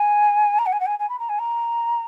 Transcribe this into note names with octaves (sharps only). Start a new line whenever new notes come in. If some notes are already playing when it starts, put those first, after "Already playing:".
Already playing: G#5
A#5
F#5
G#5
F#5
G#5
G#5
B5
A#5
G#5
A#5